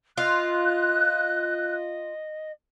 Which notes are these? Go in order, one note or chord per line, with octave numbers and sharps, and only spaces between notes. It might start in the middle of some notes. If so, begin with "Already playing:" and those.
F4 D#5 F#6